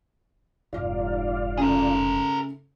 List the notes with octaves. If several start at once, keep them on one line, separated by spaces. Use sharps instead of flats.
F1 G#2 F4 D5 F5
C#3 A3 G#4 A#4